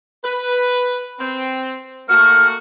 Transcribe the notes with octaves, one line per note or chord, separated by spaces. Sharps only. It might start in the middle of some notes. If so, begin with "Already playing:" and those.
B4
C4
A3 A#3 F#4 F6